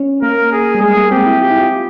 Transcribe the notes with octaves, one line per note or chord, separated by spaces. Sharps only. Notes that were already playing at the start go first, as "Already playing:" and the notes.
Already playing: C#4
A#3 A#4
G#4
G3
G#3 G#4
A#3
C4 G4
E4
F4 G4
E4
F4